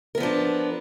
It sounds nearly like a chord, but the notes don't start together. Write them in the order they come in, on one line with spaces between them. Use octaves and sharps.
A#4 B3 F3 D4